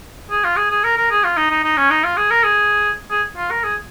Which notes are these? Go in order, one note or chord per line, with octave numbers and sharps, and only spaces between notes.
G#4
F4
G#4
G#4
A#4
A#4
G#4
F4
D#4
D#4
D#4
C#4
D#4
F4
G#4
A#4
G#4
G#4
F4
A#4
G#4